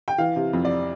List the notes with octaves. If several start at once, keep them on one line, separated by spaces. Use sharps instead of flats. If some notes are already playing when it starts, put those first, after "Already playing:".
G5
E3 F5
C3
F2
D5